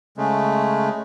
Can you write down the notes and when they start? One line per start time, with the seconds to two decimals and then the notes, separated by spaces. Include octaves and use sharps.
0.18 C#3 G#3 A3